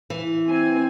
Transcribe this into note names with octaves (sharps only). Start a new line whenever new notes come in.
E3
C4 G#5